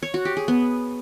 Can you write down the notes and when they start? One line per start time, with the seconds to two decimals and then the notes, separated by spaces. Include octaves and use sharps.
0.03 C#5
0.14 F#4
0.25 G4
0.37 G#4
0.48 B3